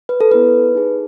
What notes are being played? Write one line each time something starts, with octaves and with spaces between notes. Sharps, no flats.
B4
A4
B3 E4 A4 B4
D#4 G#4